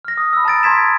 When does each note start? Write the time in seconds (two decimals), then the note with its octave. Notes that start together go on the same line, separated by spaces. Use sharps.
0.05 F6 A#6
0.17 D#6
0.33 B5 E6
0.45 A5 A#5 A6 D7
0.63 A5 A#5 C6 G#6 B6 E7